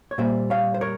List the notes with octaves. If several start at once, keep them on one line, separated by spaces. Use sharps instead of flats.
C#5
A#2 G3 A#3 C5 E5
C#5 F5
C5
A#4 C#5